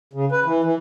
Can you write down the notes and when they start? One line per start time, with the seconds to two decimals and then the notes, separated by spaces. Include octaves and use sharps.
0.13 C#3
0.32 B4
0.45 E3
0.64 E3